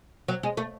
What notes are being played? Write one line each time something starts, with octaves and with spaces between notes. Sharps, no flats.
F#3
G#3
A3